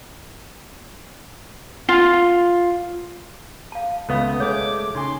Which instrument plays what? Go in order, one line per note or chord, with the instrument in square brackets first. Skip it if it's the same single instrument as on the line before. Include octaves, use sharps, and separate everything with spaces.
[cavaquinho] F4
[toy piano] F5 A5
[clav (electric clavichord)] C#2 A3 B3 [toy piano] C#4 F5 C#6 [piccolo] D#6
[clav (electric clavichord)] G#3 A3 [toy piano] C#5 [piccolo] D6
[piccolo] D6
[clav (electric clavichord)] C#3 [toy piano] D#4 G#5 [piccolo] C6